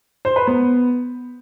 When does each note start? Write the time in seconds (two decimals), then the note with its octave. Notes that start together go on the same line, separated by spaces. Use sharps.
0.25 C5
0.36 B4
0.47 B3